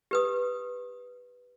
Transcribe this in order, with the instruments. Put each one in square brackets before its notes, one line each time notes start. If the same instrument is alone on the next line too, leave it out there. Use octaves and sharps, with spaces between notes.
[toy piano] G4 B4 D#6